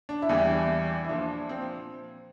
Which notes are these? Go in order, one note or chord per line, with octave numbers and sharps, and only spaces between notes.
D4
E4
E2 E3 G3
D4
E4
A#2 F3 D4
C4